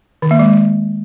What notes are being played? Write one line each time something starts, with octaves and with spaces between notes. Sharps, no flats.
D#3
A#3
G#3